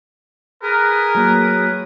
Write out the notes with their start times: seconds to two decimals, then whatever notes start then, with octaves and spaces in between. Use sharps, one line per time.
0.63 G#4 A#4 B4
1.15 F#3 A#3 B4